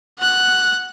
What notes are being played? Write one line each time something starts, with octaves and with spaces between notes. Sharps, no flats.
F#5 F#6